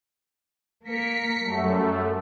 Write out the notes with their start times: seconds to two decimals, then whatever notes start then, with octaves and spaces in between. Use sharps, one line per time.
0.85 A#3 A#4 B6 C#7
1.44 F#2 G3 A3